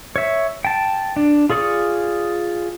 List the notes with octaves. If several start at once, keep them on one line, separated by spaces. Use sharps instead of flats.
C#5 E5
G5 A5
D4
F4 G#4 D5 C#6 D#6